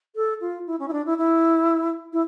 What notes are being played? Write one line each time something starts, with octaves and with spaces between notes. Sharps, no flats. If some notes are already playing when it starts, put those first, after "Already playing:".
A4
F4
E4
C#4
E4
D4
E4
E4
E4